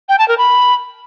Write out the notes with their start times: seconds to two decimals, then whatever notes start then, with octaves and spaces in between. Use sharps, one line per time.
0.09 G5
0.19 A5
0.28 A#4
0.38 B5